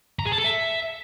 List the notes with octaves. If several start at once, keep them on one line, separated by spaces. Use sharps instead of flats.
A#5
G#4
A5
A4
E5